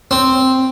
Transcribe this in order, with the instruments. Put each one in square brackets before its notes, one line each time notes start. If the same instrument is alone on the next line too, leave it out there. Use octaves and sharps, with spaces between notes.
[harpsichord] C4